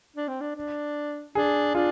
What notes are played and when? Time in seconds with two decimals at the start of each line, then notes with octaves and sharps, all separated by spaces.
0.16 D4
0.28 C4
0.41 D4
0.56 D4
1.35 D4 G#4
1.75 D4 F4